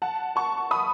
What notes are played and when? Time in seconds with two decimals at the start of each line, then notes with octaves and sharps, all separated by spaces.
0.02 F#5 A5
0.36 A5 C#6
0.71 B5 D#6